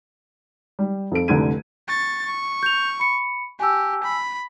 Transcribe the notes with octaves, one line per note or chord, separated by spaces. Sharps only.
G3
F2 A4 D7
F1 C2 D3 G#6 D#7
C#6 A6
C#6
G6 F7
B5 C#7
G4 G#5 A5 E6
B5